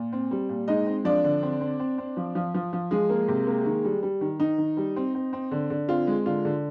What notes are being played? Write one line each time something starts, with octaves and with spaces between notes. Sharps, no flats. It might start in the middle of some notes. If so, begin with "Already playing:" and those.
Already playing: A#2
C4
G3
A#2
G#3 D#4 D#5
C4
F3 D4 D5
D3
C4
C4
C4
C4
F3
F3
F3
F3
F3 G#3 G#4
A#3
C3
A#3
D#3
G3
G3
D#3
D#3 D#4
D#3
G3
C4
C4
C4
D3
D3
C4 F4
G#3
D3 F4
D3